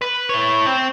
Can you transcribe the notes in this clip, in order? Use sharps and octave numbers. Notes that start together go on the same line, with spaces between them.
B4
E4 C#5
C4